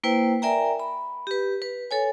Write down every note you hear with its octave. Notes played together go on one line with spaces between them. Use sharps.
A#3 E4 B4 C5 G5
A#4 D5 E5 G5 G#5 A#5
B5
G4 B4
B4
A4 C#5 G#5